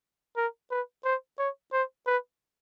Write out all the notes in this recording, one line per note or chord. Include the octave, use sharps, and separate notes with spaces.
A#4
B4
C5
C#5
C5
B4